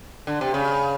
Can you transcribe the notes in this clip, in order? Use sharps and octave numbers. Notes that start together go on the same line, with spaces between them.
D3
C3
C#3